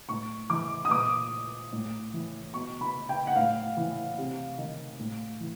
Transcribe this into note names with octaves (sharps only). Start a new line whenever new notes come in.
A2 C#6
E3 D6
D#6
A#2 D6
A2
E3
B2 C#6
B5
G5
F#5
A2 F5
E3
C3
D#3
A2
E3